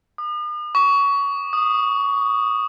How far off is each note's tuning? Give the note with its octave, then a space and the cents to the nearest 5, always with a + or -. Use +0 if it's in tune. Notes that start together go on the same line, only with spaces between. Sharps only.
D#6 -45
C#6 +20
D#6 -10